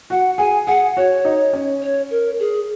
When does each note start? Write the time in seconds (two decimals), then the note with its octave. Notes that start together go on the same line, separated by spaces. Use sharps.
0.10 F#4 F#5
0.38 G#4 G#5
0.67 G#4 F#5
0.97 F#4 C#5
1.25 D#4
1.53 C#4
1.82 C#5
2.11 A#4
2.40 G#4